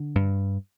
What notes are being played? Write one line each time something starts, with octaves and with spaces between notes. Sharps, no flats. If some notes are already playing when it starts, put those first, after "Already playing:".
Already playing: D3
G2